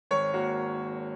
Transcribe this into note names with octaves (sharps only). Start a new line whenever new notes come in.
G#1 C#5
A#3 F#4